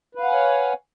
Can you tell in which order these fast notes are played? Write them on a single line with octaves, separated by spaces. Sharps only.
B4 F5 F#5 G#5 C#5